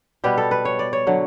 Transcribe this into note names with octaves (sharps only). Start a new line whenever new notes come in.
B2 G3 B3 G4
A4
B4
C#5
D5
C#5
D3 F#3